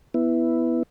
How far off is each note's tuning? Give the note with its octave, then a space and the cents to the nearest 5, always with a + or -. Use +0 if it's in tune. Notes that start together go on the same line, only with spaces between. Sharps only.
B3 +0 E4 +0